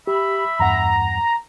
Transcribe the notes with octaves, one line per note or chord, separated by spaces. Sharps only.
G4 E5 B5
E2 G2 F#5 A#5